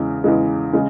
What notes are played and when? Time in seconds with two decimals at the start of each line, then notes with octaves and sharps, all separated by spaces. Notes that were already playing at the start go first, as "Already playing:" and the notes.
Already playing: E2 C#3 G#3
0.24 E2 C#3 G#3
0.73 C#3 G#3